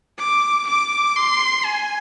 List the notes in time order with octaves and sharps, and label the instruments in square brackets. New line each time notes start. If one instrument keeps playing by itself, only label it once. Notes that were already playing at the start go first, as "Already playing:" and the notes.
[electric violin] D6
D6
C6
G#5